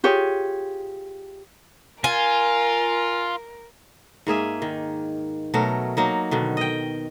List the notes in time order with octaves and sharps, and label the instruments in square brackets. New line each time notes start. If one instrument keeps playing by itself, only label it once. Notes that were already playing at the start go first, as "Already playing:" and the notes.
[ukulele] F4 G4 G#4 C#5
[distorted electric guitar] F4 [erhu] A#4 [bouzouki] G#5
[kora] G#2 A#3 G#4 E5
D#3
B2 F#3 A3 A#4
F#3 A#3 D#4
B2 D3 D#3
D#5 G5